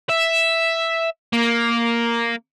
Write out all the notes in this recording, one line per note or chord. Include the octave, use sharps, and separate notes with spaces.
E5
A#3